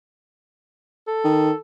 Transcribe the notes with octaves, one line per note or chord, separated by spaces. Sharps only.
A4
D#3